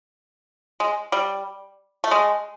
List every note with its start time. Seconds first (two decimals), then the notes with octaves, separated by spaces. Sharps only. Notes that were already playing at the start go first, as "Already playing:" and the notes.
0.80 G#3
1.12 G3
2.04 A3
2.11 G#3